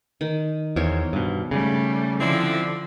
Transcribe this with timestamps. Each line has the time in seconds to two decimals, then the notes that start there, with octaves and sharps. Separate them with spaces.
0.21 D#3
0.76 E2 A#4 C5 C#5
1.13 G2 B2
1.51 C#3 G3 A3
2.20 D3 F3 C4 D4 E4